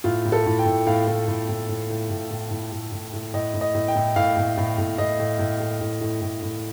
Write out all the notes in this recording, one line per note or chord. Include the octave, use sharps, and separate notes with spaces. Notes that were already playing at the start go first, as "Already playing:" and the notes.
A2 F4
A2
A4
A2
G5
A2
A2 F5
A2
A2
A2
A2
A2
A2
A2
A2
A2
A2
A2
A2 D#5
A2
D#5
A2
G5
A2
A2 F5
A2
A2
A2
A2 D#5
A2
A2
A2
A2
A2
A2
A2